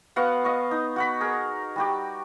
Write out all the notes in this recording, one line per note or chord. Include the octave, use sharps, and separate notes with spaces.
B3 F#4 F5 F#5
D#5 F5 C#6
D#4
F#4 F#5 B5
G#4 A#4
G3 F#4 G4